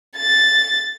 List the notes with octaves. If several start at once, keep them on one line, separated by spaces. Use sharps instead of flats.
A6